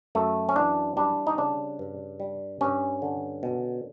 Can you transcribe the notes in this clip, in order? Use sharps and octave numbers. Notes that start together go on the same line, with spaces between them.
F#2 A3
C#4
E3 D4
G3 D4
D#4
C#3 D4
G2
G3
G2 C#4
D3
B2